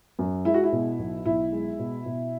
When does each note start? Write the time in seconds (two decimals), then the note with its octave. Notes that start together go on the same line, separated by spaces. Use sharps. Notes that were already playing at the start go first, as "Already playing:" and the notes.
0.19 F#2
0.45 G#3 E4
0.54 F#4
0.64 E4
0.72 B2
0.99 B1
1.25 B1 E4
1.53 G#3
1.79 B2
2.06 B2